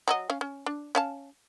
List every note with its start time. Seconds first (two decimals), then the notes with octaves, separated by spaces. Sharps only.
0.08 F#3 F#4 D#5
0.30 C#4 F5
0.41 C#4
0.66 D4
0.95 C#4 F5 A5